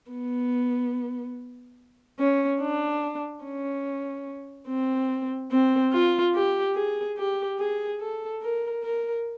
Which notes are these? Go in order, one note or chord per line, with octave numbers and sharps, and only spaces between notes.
B3
C#4
D4
C#4
C4
C4
F4
G4
G#4
G4
G#4
A4
A#4
A#4